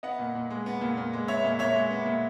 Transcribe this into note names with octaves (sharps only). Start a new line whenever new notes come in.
B3 D#5 F#5
A#2
A#2
G#3
B3
A#2
A#2
G#3
B3 C#5 E5
A#2
A#2 C#5 E5
G#3
B3
A#2